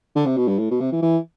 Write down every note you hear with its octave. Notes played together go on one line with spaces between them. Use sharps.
D3
C3
B2
G2
A2
B2
C3
E3
E3